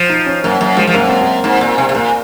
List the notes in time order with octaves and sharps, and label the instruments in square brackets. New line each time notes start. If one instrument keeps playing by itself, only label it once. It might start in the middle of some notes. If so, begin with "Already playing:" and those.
Already playing: [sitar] F3
[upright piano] D#4
C#4
[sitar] F#2 [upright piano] A#3
[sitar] F#2 [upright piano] A#3
[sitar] F3 [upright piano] G#3
[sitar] F3
[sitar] F#2 [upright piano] A#3
[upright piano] C4
A#3
[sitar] G#2
A#2
C3
C3
[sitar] A#2 [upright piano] A#3